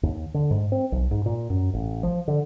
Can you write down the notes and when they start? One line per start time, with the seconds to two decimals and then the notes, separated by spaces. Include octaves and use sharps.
0.03 D#2
0.34 D3
0.51 G#2
0.72 C4
0.92 B1
1.11 G#2
1.26 A#2
1.50 F#2
1.73 A1
2.03 F3
2.28 D3